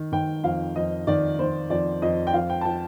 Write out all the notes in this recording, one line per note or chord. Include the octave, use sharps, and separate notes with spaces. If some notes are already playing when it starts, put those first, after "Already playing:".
Already playing: D#3
D#3 G5
F2 F5
F2 D#5
D#3 D5
D#3 C5
F2 D5
F2 D#5
G5
F3 F5
G5
A5
F3 G5